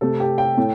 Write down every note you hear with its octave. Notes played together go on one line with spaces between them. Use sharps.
C3 A3 A4
G4
G5
A2 A3